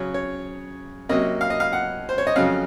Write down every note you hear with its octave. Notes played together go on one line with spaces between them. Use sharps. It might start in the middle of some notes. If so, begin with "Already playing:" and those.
Already playing: C#3 F#3 C#4 C#5
C#5
C3 F#3 A#3 C#4 D#5
F5
D#5
F5
F#5
C5
C#5
D#5
F2 C#3 F#3 C#4 F5